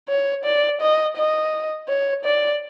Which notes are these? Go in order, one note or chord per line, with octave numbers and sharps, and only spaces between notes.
C#5
D5
D#5
D#5
C#5
D5